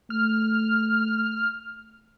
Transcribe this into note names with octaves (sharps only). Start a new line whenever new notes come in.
A3 F6